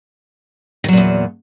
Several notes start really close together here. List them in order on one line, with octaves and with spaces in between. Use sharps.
D#3 F#3 A#2 E2